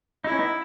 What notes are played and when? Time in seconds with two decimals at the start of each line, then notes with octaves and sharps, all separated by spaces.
0.24 D#4 E4
0.32 C#4
0.39 B3 D#4